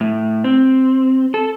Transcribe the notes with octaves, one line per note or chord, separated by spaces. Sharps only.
A2
C4
A4